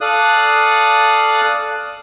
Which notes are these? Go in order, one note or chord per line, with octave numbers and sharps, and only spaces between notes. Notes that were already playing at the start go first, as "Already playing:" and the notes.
A4 D5 F5 D#6 F#6